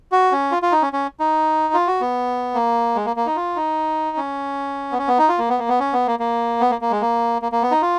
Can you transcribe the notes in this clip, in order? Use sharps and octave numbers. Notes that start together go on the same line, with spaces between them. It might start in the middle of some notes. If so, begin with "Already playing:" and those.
F#4
C#4
F4
F4
D#4
C#4
C#4
D#4
F4
F#4
B3
A#3
G#3
A#3
A#3
D#4
F4
D#4
C#4
B3
C#4
B3
D#4
F4
A#3
B3
A#3
B3
C#4
B3
A#3
A#3
B3
A#3
A#3
G#3
A#3
A#3
A#3
B3
D#4
F4